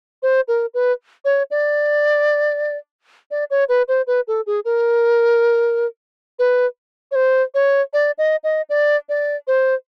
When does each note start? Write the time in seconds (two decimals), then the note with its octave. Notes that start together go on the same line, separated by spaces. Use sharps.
0.23 C5
0.48 A#4
0.74 B4
1.25 C#5
1.51 D5
3.31 D5
3.50 C#5
3.69 B4
3.88 C5
4.07 B4
4.28 A4
4.46 G#4
4.65 A#4
6.39 B4
7.11 C#5
7.15 C5
7.54 C#5
7.93 D5
8.18 D#5
8.44 D#5
8.69 D5
9.09 D5
9.47 C5